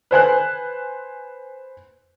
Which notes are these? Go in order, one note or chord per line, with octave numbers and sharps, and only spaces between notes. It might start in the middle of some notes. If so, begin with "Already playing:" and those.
B4 C5 G#5 F#6